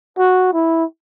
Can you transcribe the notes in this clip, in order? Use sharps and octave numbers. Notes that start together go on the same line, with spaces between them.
F#4
E4